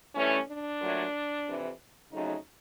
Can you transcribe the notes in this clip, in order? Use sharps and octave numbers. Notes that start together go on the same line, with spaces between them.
G2 E3 A3 C#4
D4
A#2 F#3 A3
F2 C3 E3
F2 C#3 F#3 A3 D#4